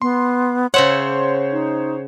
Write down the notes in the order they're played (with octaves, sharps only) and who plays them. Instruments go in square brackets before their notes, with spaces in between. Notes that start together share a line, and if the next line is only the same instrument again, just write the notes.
[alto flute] B3 [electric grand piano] C6
[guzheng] C#3 E5 F#5 [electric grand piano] C5 C#5 [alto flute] C6
[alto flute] D#4